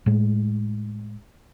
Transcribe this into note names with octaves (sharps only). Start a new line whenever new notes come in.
A2 G#3